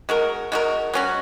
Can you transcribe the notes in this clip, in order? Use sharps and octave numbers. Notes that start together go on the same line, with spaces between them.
G#3 F#4 A#4
G#3 F#4 A#4
F#3 C#4 F#4